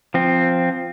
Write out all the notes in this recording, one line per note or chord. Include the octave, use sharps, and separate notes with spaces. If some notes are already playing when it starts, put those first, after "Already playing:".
F3 C4